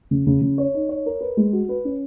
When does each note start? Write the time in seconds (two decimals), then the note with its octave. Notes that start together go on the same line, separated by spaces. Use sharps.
0.11 C#3
0.27 C#3
0.41 C#3
0.58 C#5
0.74 D#4
0.89 C#5
1.06 A#4
1.21 B4
1.37 G#3
1.53 F#4
1.69 B4
1.85 C#4